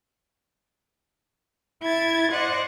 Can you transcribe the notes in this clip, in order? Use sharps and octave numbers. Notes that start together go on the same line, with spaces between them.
E4 G#6 A6
C5 D5 D#5 F#5